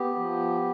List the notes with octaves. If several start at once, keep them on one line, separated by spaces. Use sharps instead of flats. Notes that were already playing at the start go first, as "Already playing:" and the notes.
Already playing: B3 G4
F3